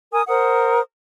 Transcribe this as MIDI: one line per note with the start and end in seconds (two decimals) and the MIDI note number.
0.12 0.22 70
0.12 0.22 80
0.12 0.22 87
0.28 0.80 70
0.28 0.80 72
0.28 0.80 78
0.28 0.80 87